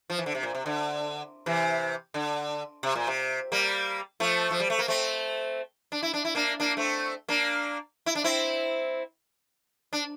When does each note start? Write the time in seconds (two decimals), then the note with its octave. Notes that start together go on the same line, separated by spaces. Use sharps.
0.10 F3
0.18 E3
0.26 D3
0.35 C3
0.43 A#2
0.55 C3
0.66 D3
1.46 C3 E3
2.14 D3
2.83 C3
2.96 A#2
3.07 C3
3.52 G3 A#3
4.20 F3 A3
4.51 F3
4.60 G3
4.70 A3
4.79 A#3
4.88 A3 C4
5.92 D4
6.03 E4
6.14 D4
6.25 E4
6.35 A#3 D4
6.60 A#3 D4
6.77 A3 C4
7.29 A#3 D4
8.06 E4
8.15 D4
8.24 C4 E4
9.93 D4